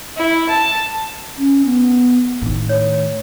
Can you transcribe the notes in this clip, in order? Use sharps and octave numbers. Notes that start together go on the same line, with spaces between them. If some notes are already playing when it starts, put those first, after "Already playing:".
E4
A5
C#4
B3
A2 D#3
C#5